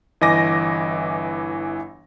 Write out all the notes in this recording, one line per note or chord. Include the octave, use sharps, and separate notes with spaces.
G1 E3 D#5 G#5 D6 A#6